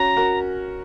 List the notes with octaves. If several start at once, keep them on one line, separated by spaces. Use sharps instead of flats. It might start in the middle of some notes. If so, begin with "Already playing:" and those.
Already playing: C#4 F#4 A#5
F#4 A#4